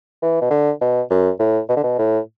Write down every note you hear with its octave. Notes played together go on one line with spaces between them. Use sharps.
E3
B2
D3
B2
F#2
A2
B2
D3
B2
A2